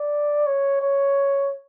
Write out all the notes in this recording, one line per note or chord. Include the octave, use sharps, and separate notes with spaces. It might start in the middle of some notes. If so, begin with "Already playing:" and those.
Already playing: D5
C#5
C#5